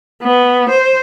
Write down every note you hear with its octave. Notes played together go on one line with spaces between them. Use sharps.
B3
C5